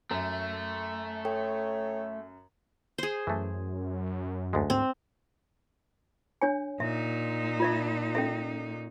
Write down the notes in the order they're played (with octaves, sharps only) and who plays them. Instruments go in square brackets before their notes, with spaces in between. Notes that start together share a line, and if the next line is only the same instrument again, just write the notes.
[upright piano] F#2 [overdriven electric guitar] A3
[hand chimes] A4 G5 [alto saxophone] C#5
[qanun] G#4 C5
[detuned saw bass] F#2 [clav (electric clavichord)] E3 A3
[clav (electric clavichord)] D2 G#3
[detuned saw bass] G#2 [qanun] C4
[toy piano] D4 C#5 G#5
[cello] A#2 D#4 [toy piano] E5
[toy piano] F4 D5 E5
C#4 A4 E5